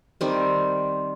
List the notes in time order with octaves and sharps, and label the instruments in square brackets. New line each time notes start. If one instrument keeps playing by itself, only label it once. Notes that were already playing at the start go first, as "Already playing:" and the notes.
[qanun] D#3 G3 C4